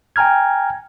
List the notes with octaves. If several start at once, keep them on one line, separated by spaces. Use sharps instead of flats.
G5 G#5 A#5 F6 G#6